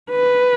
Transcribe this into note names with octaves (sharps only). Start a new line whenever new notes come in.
B4